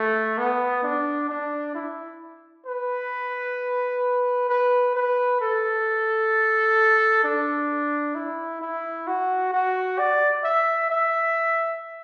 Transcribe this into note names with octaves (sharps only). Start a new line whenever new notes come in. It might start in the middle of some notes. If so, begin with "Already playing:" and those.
Already playing: A3
B3
D4
D4
E4
B4
B4
B4
A4
D4
E4
E4
F#4
F#4
D5
E5
E5